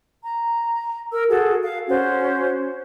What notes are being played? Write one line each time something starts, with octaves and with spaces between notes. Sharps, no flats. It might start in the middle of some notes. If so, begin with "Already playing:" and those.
A#5
A#4 E6
F#4 G#4 A4
F5
C#4 F#4 C5